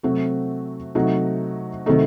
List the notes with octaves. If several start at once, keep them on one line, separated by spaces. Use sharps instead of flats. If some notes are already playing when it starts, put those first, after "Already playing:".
C3 F#3 A3 C4 F#4
C3 F#3 A3 D#4 F#4
C3 D#3 F#3 A3 D#4